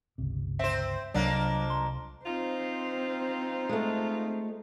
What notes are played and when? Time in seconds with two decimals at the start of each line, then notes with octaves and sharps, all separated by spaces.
0.18 G1 C#2 C3
0.59 C4 C5 E5
1.14 C2 F2 F#3 A#3 D4
1.70 C6
2.26 C4 D#4 F4 C5
3.69 G#3 A3